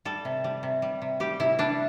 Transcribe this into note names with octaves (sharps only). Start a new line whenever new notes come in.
G3 A4
C3
G3
C3
G3
C3
G3 G4
C3 E4
G3 D4